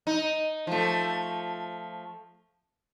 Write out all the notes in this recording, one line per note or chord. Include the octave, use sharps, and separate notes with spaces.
D#4
F3 A3